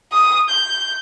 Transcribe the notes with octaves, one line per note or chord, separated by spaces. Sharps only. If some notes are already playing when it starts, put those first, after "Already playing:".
D#6
G6